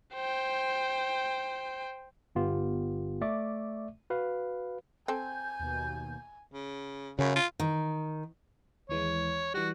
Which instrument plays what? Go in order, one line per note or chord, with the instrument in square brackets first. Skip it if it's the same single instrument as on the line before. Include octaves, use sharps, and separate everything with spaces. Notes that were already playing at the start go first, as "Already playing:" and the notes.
[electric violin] C5 G5
[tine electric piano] G1 B3 F4 G4
A3 D5 E5 C#6 D6
F#4 B4 F5
[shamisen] C4 A4 [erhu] G#5 [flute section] G6
[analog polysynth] D#2 B2
[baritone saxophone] C#3
[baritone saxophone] F#2 [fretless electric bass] C#3
[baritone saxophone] F4
[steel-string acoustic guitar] D#3
[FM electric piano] D#2 E3 G#3 [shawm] C#5
[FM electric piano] E3 G3 [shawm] F#4